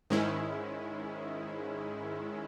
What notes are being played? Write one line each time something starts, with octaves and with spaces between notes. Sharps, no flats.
G#2 D#3 G#3 C#4 E4